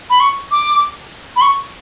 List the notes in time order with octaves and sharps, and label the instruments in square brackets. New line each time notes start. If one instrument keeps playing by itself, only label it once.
[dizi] B5
C#6
D6
B5
C#6